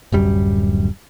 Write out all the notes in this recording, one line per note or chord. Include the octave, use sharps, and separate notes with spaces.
D1 F#2 G3